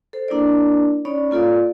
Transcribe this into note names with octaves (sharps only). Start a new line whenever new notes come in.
A4 C5
A#3 D4 E4 A#4 D5
C#4 D#4 C#5 D5 B5
A#3 F4 A4 D5 F5